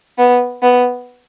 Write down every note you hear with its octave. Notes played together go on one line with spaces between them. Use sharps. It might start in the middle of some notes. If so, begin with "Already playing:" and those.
B3
B3